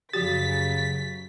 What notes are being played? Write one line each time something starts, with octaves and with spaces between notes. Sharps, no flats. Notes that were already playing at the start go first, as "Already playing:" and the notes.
F#2 C#3 F3 F#4 G4 A6 B6